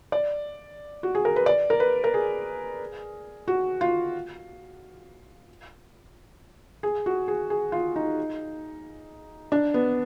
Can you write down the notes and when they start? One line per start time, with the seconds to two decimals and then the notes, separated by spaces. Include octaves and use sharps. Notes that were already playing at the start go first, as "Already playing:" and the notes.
0.12 D5
1.03 F#4
1.15 G#4
1.25 A#4
1.36 B4
1.46 D5
1.70 A#4
1.80 B4
2.04 A#4
2.14 G#4
3.48 F#4
3.81 F4
6.83 G#4
7.06 F#4
7.28 G#4
7.50 G#4
7.72 F4
7.96 D#4
9.52 D4
9.74 B3